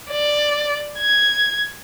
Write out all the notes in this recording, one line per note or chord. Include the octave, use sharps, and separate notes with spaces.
D5
G#6